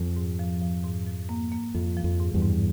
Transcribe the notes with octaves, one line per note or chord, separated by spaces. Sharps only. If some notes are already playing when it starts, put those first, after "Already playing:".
Already playing: F2
G#2
F3
F3
G#2
F3
A#3
A#3
F2 F3
F3
F2
G#2
E2 G2
G#2